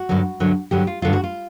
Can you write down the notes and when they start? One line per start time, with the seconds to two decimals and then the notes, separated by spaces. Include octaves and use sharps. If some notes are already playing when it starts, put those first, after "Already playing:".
Already playing: F#4
0.09 G2 D3 F#3
0.40 G2 D3 F#3
0.71 G2 D3 F#3 G4
0.87 F4
1.02 G2 D3 F#3 F4
1.13 F#4
1.24 F4